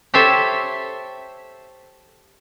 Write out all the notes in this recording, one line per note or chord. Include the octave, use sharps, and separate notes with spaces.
G4 A4 C5 C#5 E5